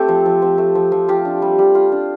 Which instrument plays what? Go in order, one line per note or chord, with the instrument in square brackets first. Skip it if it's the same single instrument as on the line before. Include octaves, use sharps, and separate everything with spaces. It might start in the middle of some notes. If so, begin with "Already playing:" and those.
Already playing: [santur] A3 C4 G4 A4
F3
F3
C4
A3
F3
F3
F4 G4
D4
G3
G3
F4
D4